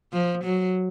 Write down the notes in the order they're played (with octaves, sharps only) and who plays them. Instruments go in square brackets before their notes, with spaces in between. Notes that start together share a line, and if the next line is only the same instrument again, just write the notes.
[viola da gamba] F3
F#3